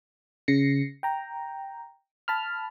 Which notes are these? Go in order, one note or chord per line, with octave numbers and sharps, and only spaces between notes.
C#3 A#6 C7 C#7
G5 A#5
A5 B5 F6